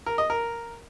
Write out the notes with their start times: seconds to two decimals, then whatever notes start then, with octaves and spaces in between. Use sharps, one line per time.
0.06 A#4
0.18 D#5
0.30 A#4